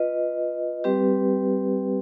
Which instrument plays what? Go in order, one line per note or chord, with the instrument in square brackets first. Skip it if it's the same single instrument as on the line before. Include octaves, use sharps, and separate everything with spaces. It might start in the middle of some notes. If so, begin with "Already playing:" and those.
Already playing: [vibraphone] F4 B4 D#5
G3 C4 G4 B4